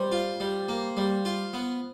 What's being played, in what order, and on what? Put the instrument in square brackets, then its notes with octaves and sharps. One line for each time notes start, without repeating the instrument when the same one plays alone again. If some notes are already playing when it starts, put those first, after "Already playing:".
Already playing: [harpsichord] G3 [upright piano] C5
[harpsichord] F4
G3
A#3
G3
F4
B3